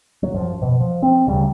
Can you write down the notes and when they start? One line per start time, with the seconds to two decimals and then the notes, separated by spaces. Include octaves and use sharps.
0.23 F#3
0.34 F#2 F3
0.62 B2
0.80 F3
1.02 C4
1.27 D2 C#3 G3